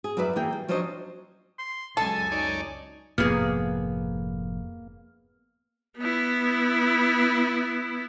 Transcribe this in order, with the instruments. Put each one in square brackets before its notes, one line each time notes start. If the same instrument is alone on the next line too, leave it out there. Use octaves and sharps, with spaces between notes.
[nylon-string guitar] G#4
F#2 F#3 E4 B4 D5 E5
E3 A#3 G#4 G5
G3
F3 F#3 C#4 D4 C5 D#5
[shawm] C6
[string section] C#2 F#2 G#5 [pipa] A4 [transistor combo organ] D#5 [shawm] A5
[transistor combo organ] D#4 C#5 D5
[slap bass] F1 F2 G#2 [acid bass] A#3 [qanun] B3 G#4 [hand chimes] F6
[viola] B3 E4